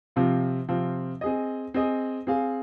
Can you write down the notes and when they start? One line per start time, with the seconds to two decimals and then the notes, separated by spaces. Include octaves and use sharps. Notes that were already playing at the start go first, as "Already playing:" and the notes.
0.16 C3 F3 C4 F4
0.68 C3 F3 C4 F4
1.21 C4 G#4 D#5
1.74 C4 G#4 D#5
2.27 C4 G#4 F5